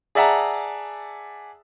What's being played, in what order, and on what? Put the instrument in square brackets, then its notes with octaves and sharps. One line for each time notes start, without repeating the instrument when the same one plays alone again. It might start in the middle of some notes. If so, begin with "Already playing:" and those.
[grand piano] G#4 D5 E5 F#5 A5 A#5